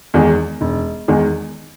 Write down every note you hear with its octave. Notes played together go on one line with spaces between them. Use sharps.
E2 D#3 G#3
E1
E2 D#3 G#3